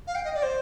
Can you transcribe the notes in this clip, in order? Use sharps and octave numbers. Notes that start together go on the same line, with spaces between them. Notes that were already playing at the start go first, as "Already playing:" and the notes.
F5
G5
D#5
D5
C5